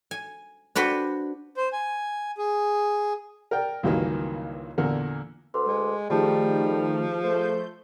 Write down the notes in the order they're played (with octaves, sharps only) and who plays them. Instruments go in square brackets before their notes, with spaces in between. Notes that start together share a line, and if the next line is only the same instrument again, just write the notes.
[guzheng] G#5
D4 F#4 B4 C5 G5
[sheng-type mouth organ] C5
G#5
G#4
[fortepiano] A#4 D5 G5
C#2 G2 D#3 E3 F#3 A#3
E2 A#2 D3 A#4
[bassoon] D2 [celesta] B4 C6 D6
[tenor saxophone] G#3
[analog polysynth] D#3 A3 D#4 [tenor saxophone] F3 [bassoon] G3 [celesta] G4 G#4 A5
[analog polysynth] A3 G6 [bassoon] C5